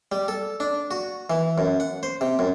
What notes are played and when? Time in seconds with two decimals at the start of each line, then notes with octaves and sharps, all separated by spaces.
0.12 G3
0.28 A4
0.60 D4
0.91 F#4
1.30 E3
1.58 F#2
1.80 F#5
2.03 C5
2.21 C3
2.39 F#2